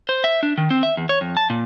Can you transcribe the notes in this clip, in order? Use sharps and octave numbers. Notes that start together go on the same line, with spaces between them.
C5
E5
D4
D#3
C4
E5
E2
C#5
F2
A5
A#2